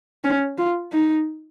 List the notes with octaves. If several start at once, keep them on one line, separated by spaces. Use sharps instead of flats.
C#4
F4
D#4